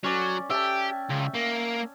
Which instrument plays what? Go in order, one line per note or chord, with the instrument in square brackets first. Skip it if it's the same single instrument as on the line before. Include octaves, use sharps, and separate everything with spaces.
[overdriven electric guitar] F#3 [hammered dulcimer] C#4 D5
[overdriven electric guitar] G4 [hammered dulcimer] E5 G5 A5
[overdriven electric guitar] C#2
A#3